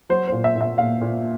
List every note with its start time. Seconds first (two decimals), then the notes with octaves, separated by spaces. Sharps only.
0.09 F#3 C5
0.28 A#2 C5
0.44 E5
0.56 A#2
0.61 E5
0.78 A#2 F5
1.01 A#2